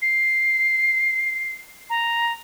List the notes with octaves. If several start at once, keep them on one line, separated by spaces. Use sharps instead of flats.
C7
A#5